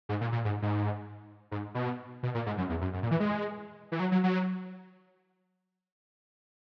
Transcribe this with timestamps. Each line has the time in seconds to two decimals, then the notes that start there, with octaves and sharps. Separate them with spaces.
0.09 G#2
0.21 A#2
0.32 A#2
0.45 G#2
0.62 G#2
1.51 G#2
1.75 B2
2.23 B2
2.34 A#2
2.46 G#2
2.58 F#2
2.69 E2
2.81 F#2
2.94 F#2
3.03 A#2
3.11 E3
3.20 G#3
3.92 E3
4.00 F#3
4.12 F#3
4.24 F#3